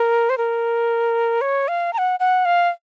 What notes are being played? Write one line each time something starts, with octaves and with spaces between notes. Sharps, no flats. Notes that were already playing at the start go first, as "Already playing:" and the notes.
Already playing: A#4
C5
A#4
C#5
F5
A#5
F#5
F#5
F5